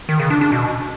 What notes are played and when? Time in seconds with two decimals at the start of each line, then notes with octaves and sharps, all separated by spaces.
0.09 D#3
0.20 C#3
0.30 D4
0.41 D4
0.52 B2